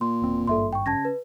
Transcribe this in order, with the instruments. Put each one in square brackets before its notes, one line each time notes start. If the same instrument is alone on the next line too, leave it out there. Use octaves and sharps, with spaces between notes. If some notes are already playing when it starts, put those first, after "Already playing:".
[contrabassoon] A#2 [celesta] C6
[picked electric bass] E1 C4
[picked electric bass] G#1 G2 [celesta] A4 E5 C6
[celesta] G5 C#6
[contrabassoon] C#3 [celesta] A5 G#6 A#6
[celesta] B4